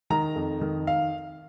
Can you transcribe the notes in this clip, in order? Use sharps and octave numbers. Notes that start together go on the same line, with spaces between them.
D#3 A#5
F2
D#3
F5